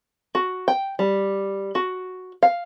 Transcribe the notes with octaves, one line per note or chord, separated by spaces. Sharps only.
F#4
G5
G3
F#4
F5